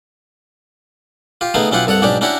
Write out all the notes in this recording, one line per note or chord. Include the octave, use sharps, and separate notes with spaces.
F4 G4
C#3 A3 B3 C#4 D#4 G#4
B1 C#4 E4 F4 G4 F#5
C2 G2 A4 C#5 F#5
B1 G#2 C#4 D4 G4 D5
C#4 D4 E4 F#4 G4 C#5